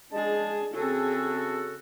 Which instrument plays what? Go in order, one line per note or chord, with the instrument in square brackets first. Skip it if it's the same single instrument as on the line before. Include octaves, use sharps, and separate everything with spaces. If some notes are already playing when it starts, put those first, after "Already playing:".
[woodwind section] G#3 A5 [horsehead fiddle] D4 G#4
[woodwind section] C#3 F#4 A4 [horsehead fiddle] C4 G#4